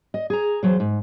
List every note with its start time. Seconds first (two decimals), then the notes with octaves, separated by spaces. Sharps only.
0.14 D#5
0.30 G#4 A#5
0.63 E2 F#3 C5
0.80 G#2